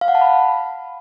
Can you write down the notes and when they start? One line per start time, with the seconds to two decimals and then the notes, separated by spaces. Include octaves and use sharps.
0.01 F5
0.08 F#5
0.15 A5
0.21 B5